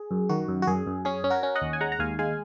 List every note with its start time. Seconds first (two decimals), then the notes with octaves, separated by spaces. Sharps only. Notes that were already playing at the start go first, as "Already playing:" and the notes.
Already playing: G#4
0.11 F#2
0.29 D#3 F#4
0.48 F#2
0.62 F#4
0.67 F#2 G#4
0.87 F#2
1.05 C#4 G#4
1.24 C#4
1.30 F#4 A#4
1.43 C#4
1.55 D#5 F#5
1.62 D#2
1.73 G#5
1.81 G#3 F#5 A#5
1.92 A#5
1.99 D#2 F5 G#5
2.19 G#3 F5 G#5